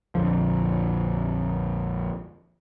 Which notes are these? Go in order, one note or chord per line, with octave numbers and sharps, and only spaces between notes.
A#1 F2 D3 F3